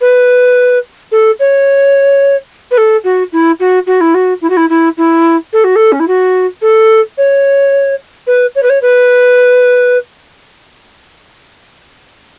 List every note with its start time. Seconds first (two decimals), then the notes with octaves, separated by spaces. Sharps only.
0.01 B4
1.12 A4
1.40 C#5
2.71 B4
2.78 A4
3.04 F#4
3.32 E4
3.60 F#4
3.87 F#4
4.01 E4
4.14 F#4
4.42 E4
4.50 F#4
4.57 E4
4.70 E4
4.98 E4
5.53 A4
5.64 F#4
5.76 A4
5.92 C#4
6.00 E4
6.08 F#4
6.62 A4
7.18 C#5
8.27 B4
8.56 C#5
8.63 B4
8.70 C#5
8.82 B4